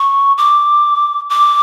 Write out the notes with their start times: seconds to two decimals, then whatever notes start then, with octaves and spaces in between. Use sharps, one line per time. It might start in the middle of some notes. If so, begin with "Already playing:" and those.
Already playing: C#6
0.38 D6
1.30 D6